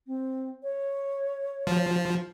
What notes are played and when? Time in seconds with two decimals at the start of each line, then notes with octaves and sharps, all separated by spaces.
0.07 C4
0.63 C#5
1.67 F3